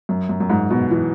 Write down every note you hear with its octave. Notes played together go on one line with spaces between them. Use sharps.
F#2
F#2
F#2
G#2
B2
E3